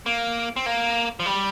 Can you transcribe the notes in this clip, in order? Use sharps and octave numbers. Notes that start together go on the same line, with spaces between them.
A#3
C4
A#3
F3
G3